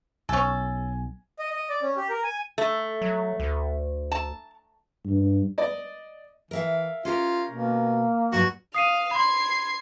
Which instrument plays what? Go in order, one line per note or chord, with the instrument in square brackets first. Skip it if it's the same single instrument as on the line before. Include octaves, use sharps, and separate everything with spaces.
[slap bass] B1 [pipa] C#4 A4 [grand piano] G#5
[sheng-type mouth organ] D#5
D#5
D5
C#4
G4
A#4
G#5
[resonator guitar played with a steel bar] A3
[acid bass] F#3
D2
[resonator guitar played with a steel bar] A5
[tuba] G2
[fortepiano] D5 D#5
[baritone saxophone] E3 [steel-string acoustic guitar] A#4 E5 F5
[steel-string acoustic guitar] C#4 G4 A#4 [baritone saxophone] F4
[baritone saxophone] B2 [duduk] A#3
[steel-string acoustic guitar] G2 F#3 G3 [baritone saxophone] F#4
[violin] F5 [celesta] D#6 C7 D#7
[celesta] B5 C6 [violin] G#6 C7